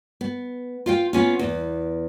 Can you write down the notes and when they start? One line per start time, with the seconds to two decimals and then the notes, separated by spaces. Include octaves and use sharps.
0.21 B3
0.86 F4 F5 G5
1.13 B3 C#4 F4
1.39 E2 B3